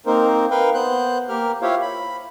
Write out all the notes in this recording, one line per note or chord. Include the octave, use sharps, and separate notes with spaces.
A#3 C4 D#4 A#4 C5
A#4 B4 F5 G5
B3 C5 F#6 G6
A#3 G4 A#4 F6
E4 F4 G4 C5 C#5 F5
B5